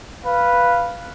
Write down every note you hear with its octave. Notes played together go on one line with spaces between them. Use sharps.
B4 F5